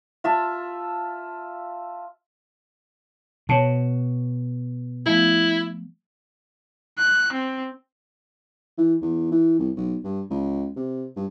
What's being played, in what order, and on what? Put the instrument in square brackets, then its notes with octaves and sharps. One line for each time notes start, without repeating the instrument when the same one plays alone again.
[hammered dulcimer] F4 E5 A5
[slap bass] B2 [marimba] C#5 A5
[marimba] F3 A3 B3 [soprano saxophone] E4
[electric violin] F#6
C4
[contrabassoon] E3
E2
E3
C2
B1
G2
C#2
C3
G2